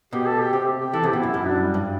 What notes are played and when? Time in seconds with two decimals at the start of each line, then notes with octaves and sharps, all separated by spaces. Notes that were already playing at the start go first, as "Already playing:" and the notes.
0.13 B2 G4
0.27 A4
0.39 G4
0.53 C3 G4
0.80 G4
0.93 E3 A4
1.03 C3 G4
1.13 B2
1.19 F#2 E4
1.34 F#2 E4
1.46 D4
1.61 G3
1.74 G2